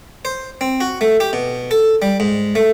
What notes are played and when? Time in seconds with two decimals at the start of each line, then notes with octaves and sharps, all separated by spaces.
0.25 C5
0.61 C4
0.81 F#4
1.01 A3
1.20 G4
1.33 B2
1.71 A4
2.02 G3
2.20 G#2
2.55 A3